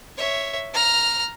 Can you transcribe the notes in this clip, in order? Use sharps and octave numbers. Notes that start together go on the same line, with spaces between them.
C#5 E5
A#5 F6